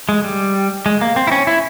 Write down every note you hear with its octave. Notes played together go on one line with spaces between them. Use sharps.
G#3
G3
G#3
A#3
C4
E4
C#4
E4